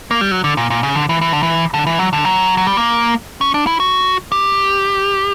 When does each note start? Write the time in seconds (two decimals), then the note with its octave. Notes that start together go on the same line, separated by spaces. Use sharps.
0.11 A#3
0.21 G3
0.31 F#3
0.44 D3
0.57 A#2
0.70 A#2
0.83 C#3
0.96 D3
1.09 E3
1.21 E3
1.33 D3
1.43 E3
1.74 D3
1.87 E3
1.99 F#3
2.13 D3
2.25 F#3
2.57 F#3
2.67 G3
2.77 A#3
3.41 C#4
3.54 D4
3.67 E4
3.80 F#4
4.32 G4